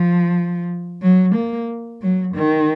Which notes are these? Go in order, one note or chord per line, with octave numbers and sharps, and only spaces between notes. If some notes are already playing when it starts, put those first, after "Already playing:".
Already playing: F3
F#3
A#3
F#3
D#3